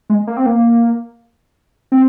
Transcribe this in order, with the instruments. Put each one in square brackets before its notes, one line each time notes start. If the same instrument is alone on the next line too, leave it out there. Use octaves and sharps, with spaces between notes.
[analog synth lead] G#3
A#3
C4
A#3
C4